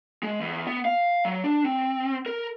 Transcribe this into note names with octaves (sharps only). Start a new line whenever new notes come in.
G#3
E2
B3
F5
F#3
D4
C4
A#4